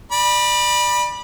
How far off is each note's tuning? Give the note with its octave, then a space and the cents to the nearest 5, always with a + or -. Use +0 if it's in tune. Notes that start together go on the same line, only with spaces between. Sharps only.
D5 +30 B5 -20